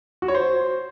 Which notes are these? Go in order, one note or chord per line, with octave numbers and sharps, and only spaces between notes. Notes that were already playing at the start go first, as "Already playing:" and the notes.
F#4
C#5
C5